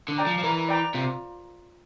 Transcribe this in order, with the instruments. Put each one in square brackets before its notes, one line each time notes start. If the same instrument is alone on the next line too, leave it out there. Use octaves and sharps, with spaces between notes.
[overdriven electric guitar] D3
[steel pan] D5 G5 A#5
[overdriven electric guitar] F3
F3
[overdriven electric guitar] E3 [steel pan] A#4
[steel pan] D5 G5 A#5
[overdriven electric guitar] C3 [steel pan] F4